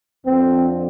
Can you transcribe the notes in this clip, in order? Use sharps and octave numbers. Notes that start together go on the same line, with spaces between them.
F2 D3 F3 C4